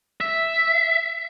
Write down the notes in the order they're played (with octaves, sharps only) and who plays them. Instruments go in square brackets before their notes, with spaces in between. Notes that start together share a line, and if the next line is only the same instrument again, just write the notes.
[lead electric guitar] E5